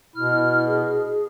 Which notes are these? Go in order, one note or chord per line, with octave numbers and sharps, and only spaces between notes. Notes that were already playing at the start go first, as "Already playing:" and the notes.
B2 E4 F6
G#4